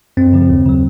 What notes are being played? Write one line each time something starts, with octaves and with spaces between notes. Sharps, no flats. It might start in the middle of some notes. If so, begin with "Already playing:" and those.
F#2 C4
C#3 F3
D#2
C#3 F#3